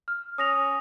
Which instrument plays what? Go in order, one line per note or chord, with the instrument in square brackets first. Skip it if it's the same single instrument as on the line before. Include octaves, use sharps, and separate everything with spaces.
[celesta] F6
[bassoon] C#4 [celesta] D#6 A#6 F7